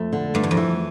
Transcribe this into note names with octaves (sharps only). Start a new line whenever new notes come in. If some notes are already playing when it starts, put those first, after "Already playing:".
Already playing: F2 A3
D3
G2 A3
E2
F2
E3